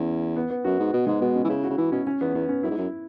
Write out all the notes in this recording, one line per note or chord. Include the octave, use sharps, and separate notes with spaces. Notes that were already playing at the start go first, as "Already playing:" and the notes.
Already playing: E2 C#4
B3
B3
F#2 F#4
G#2
B2 B3
G#2 G#3
B2 B3
C#4
E3
C#3 E4
F#4
C#3
E3 E4
B2 C#4
C#4
E2 B3
E2 B3
C#4
F#2 E4
G#2
F#2